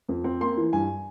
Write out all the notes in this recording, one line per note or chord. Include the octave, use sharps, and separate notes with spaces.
F2
C4
A#3 C6
E3
G2 G#5